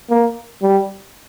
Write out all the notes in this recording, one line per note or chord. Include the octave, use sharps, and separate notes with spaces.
A#3
G3